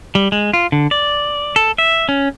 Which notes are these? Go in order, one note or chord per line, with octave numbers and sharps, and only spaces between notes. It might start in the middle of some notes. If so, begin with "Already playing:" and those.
G3
G#3
F4
D3
D5
A4
E5
C#4